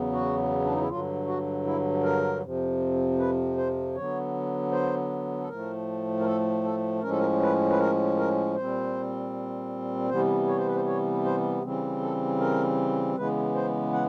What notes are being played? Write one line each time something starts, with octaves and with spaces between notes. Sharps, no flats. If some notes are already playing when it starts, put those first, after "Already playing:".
Already playing: E2 C#3 F#3 B3
F#4
D4
D#4
E4
G2 D3 F#3 F4
F#4
E4
A#4
F2 C3 F3
B4
C5
D3 F#3 B3 C#5
C5
A4
A2 F3 A3 A#4
A#4
A4
A4
A2 F3 G#3 C#4 A#4
A4
A#4
B4
B4
A#4
A#4
A#2 G3 C4 C5
C3 E3 G3 B3 C5
C#5
C5
B4
C5
C#5
C5
C#3 E3 G3 C4
A4
A#4
C#3 E3 G#3 B3 B4
C5
F#5